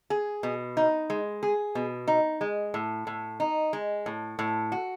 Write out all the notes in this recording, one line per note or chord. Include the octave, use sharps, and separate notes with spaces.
G#4
B2
D#4
G#3
G#4
B2
D#4
G#3
A2
A2
D#4
G#3
A2
A2
F#4